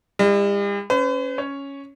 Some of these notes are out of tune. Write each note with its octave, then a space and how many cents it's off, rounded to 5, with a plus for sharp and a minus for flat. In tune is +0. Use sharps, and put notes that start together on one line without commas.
G3 +45 E4 +0
C#4 +0 B4 +45
C#4 +0 C#5 +0